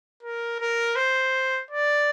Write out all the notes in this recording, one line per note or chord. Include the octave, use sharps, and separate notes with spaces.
A#4
A#4
C5
D5